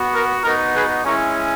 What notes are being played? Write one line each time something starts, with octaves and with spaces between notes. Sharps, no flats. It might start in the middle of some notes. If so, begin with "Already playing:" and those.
Already playing: B3 F#4
A#4
B3 D#4 F#4 A#4
G#4 B4
G#3 C#4 E4 A#4 C#5